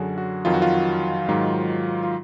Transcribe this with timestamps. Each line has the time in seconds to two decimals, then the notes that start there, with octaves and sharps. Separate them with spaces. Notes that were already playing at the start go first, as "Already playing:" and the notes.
Already playing: F#2 D3 F#3 F#4 G#4
0.18 F#4
0.45 F2 D#3 F#3 F4
0.54 F#4
0.62 F4
1.29 G#2 D#3 F#3
2.03 F4